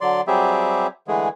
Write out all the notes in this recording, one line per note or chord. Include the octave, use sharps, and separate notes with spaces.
D3 F#3 D5 C6
F#3 G3 C4 G4 G#4 E5
D3 E3 G#3 A3 G#4